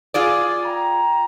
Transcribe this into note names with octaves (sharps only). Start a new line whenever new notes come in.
F4 G#4 D5
G5 A#5